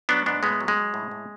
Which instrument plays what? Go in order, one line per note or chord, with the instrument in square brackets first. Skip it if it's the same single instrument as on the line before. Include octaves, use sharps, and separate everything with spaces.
[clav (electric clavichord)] F#3 B3 D4
G#2 B3 D4
A2 G#3 B3
F#3
G#3
F#3
A2
A2